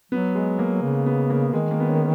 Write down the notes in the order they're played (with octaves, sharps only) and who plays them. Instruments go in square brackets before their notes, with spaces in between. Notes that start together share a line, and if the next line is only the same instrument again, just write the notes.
[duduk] F#3 [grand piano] B3
[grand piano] G#3
A#3
[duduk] C#3
[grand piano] B3
A#3
[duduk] D#3 [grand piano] G#3
[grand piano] A#3
B3
C#4